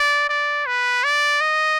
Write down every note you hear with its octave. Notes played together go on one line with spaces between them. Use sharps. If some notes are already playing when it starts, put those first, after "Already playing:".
Already playing: D5
D5
B4
D5
D#5